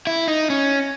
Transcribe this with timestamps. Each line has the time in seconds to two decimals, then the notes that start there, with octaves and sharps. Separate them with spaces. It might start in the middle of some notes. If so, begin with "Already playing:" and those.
0.07 E4
0.28 D#4
0.50 C#4